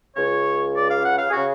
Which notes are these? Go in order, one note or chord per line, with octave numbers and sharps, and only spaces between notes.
C#2 C#3 C#5
D5
F5
F#5
F5
G#4
C#3 F#4